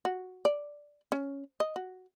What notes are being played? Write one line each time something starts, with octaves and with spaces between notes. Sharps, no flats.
F#4
D5
C#4
D#5
F#4